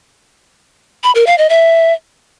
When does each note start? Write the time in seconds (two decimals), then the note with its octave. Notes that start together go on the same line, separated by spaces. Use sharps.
1.04 B5
1.15 A#4
1.27 F5
1.38 D#5
1.50 E5